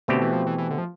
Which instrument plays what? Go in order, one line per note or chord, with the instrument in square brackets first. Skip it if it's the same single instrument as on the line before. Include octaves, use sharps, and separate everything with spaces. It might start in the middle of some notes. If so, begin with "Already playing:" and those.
[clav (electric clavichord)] B2 A3 C4 G4 [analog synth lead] D3
[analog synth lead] E3
F3
E3
E3
D3
F3